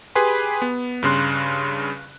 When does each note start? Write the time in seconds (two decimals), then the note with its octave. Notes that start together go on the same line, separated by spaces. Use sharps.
0.15 G4 G#4 B4 G#5 B5 C6
0.62 B3
1.03 G2 C#3 C6 F#6